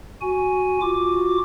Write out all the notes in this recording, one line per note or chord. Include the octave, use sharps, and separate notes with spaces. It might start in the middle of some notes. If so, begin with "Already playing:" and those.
F#4 G#5
F4 F#4 D6